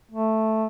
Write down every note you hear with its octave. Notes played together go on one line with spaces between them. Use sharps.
A3